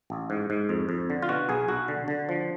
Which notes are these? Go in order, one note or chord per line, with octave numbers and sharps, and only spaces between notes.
A1
G#2
G#2
F2
F2
D3
F4
B2 F#4
B1 G#4
B1 F#4
D3
D3
F3